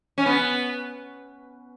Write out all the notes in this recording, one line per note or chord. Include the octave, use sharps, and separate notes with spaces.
C#4
B3